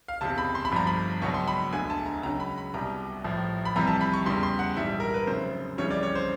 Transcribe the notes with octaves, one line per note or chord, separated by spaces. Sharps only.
F5
F#1 E2 C3 A5
B5
C6
B5
G1 G2 D3 F3 A#5
B5
C#2 B2 F#3 C#6
C6
B5
E1 D2 D3 G#5
A5
A#5
C#2 C#3 F#3 A#5
B5
B5
C2 B2 G3 A#5
A1 A2 F3
B5
F2 C3 E3 G3 A#5
A5
B5
C#6
E2 C#3 E3 G3 C6
C6
F#5
A#1 G#2 E3 G3 E5
A#4
B4
F1 F2 C#3 F#3 C5
F#1 F2 C#3 E3 G3 C#5
D5
C#5
C5